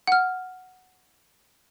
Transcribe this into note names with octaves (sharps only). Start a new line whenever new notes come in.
F#5 F6